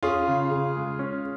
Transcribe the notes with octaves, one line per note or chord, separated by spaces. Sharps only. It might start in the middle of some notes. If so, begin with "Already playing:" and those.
C#4 F4 G#4
C#3
C#3
G#3
C#4